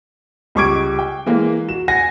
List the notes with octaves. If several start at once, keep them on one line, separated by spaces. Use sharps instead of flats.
C#2 G3 C#6 D6 G#6 D7
G5
E3 G#3 A#3
F#4 E7
F#5 G#5 A#6